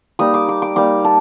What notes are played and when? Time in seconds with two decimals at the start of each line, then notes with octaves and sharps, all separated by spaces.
0.19 G3 A#3 D#4 D#6
0.34 D6
0.49 D6
0.62 D6
0.76 G3 A#3 D#4 D6
1.05 A5